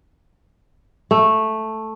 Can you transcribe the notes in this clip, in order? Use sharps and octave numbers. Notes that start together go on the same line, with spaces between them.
A3